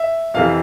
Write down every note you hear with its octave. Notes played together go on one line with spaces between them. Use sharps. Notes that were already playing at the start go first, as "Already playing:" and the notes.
Already playing: E5
F2 C3 E3 F5